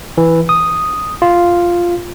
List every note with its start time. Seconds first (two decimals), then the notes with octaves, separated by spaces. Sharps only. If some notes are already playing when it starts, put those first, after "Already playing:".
0.18 E3
0.49 D#6
1.22 F4